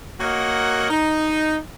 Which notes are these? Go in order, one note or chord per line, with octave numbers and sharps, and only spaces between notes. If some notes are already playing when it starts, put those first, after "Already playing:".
A#3 F#4 A#4 C#5 D#5 F#5
D#4